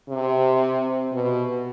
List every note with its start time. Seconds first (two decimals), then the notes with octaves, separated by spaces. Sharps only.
0.09 C3
1.12 B2